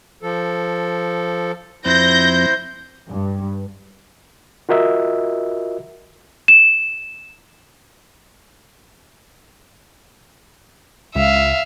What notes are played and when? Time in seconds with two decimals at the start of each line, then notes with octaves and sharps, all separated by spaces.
0.23 F3 A4
1.85 F2 F3 C4 E4 C5 G6 A#6
3.09 G2
4.69 F4 F#4 A#4 D#5 E5
6.48 E7
11.15 C#2 E5 F5